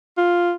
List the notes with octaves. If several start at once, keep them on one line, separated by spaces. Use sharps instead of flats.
F4